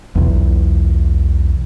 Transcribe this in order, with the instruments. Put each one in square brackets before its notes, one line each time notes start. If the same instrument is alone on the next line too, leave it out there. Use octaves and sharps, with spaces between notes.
[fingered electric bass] B1 E2